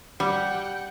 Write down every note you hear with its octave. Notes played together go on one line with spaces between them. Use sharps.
G3 F#5 G5